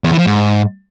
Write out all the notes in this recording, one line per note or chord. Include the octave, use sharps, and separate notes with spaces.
E2
E3
F3
G#2